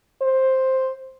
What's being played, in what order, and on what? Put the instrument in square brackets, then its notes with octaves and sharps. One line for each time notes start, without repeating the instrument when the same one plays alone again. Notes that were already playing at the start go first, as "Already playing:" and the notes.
[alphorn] C5